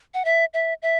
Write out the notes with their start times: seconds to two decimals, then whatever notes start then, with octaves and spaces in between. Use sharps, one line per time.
0.14 F#5
0.25 E5
0.54 E5
0.82 E5